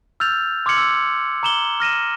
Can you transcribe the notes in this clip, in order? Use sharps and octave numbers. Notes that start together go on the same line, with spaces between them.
E6 F6 G6 A6 F7
C6 D6 F6 G#6 C#7 F#7
E6
A#5 D6 E7 F#7 G7
F6 A#6 D#7 E7